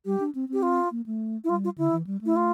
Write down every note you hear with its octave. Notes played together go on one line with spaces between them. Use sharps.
G3 G4
D4
C4
C4 G4
F4
A#3
A3
E4
G3 F4
F4
D3 E4
E3
G3
A3 E4
F4